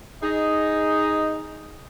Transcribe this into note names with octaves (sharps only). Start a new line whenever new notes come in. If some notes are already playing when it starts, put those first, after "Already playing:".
D#4 G#4 D#5